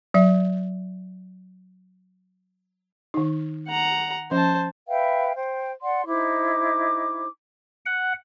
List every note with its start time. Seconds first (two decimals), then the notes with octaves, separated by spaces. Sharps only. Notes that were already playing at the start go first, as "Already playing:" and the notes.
0.14 F#3 E5
3.14 D#3 D#4
3.69 F#5 A#5
4.31 F3 C#4 C5 A5
4.88 B4 E5 F5 G5
5.35 C5 G5
5.82 D5 F#5 C6
6.07 D#4 E4 C5 D6
7.86 F#5